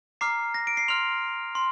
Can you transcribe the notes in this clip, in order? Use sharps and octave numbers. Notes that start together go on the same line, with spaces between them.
A#5 D6 F6 C7
A#6
D7
C7
C6 F6 F7
C6